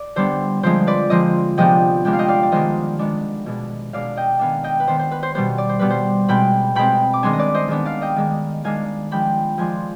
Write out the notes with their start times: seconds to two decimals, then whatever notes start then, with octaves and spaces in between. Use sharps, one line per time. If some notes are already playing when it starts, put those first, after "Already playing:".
Already playing: D5
0.16 D3 G3 B3 D4 C5
0.63 D3 F3 G#3 C4 C5
0.87 B4 D5
1.10 D3 F3 G#3 C4 C5 D#5
1.57 C3 F3 G#3 B3 D4 D#5 G5
2.05 C3 F3 G#3 B3 D4 G5
2.13 F5
2.19 D#5 G5
2.28 D5 F5
2.43 D5
2.52 D#3 G#3 B3 D4 C5 D#5
2.99 D#3 G#3 B3 D4
3.46 B2 G#3 D4
3.93 B2 G#3 D4 D5 F5
4.17 D#5 G5
4.39 D#3 B3 D4 F5 G#5
4.64 D#5 G5
4.80 B4
4.87 D#3 B3 D4 C5
4.99 C5
5.11 B4
5.23 C5
5.35 B2 G3 B3 C5
5.58 D5
5.69 C5
5.79 B2 G3 B3 B4
5.90 C5
6.28 B2 G#3 C4 G5 B5
6.75 B2 G#3 C4 G5 B5
7.13 D6
7.23 D#3 G#3 B3 D4 G#5 C6
7.33 D#5
7.38 B4 D5
7.54 C5 D#5
7.68 D#3 G#3 B3 D4
7.85 D5 F5
8.02 D#5 G5
8.16 D#3 G#3 D4
8.64 D#3 G#3 D4 F5 G#5
9.11 F3 G#3 D4 G5 B5
9.58 F3 G#3 D4 G#5 C6